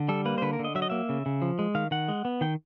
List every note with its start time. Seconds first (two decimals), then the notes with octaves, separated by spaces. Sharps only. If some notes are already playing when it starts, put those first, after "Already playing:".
Already playing: D3
0.09 G3 A4
0.25 A#3 B4
0.38 C5
0.42 D3 B4
0.53 A#4
0.59 D3
0.64 D#5
0.75 F#3 E5
0.82 D#5
0.90 A#3 E5
1.09 C#3
1.26 C#3
1.42 F3
1.59 G#3
1.75 D#3 F5
1.91 D#3 F#5
2.08 G#3
2.25 B3
2.41 D#3 G5